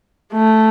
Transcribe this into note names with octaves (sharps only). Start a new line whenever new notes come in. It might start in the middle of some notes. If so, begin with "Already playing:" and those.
A3